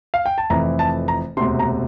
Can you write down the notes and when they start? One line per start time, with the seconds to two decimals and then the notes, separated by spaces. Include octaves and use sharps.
0.14 F5
0.26 G5
0.38 A5
0.50 F1 F2 E3 A#5
0.79 A5
1.08 A#5
1.37 E1 D2 C3 C6
1.59 A#5